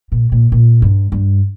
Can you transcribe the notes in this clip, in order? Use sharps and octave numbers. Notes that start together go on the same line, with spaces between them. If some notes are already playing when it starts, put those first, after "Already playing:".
A#2
A#2
A#2
G2
G2